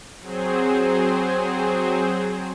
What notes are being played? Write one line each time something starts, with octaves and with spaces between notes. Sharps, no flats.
F#3 C4 G#4 C5